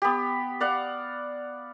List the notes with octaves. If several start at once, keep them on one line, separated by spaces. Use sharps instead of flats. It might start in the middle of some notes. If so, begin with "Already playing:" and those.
B3 G4
D5 F5 F#5